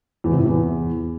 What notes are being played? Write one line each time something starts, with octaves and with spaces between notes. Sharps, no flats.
E2
C3
A2
E2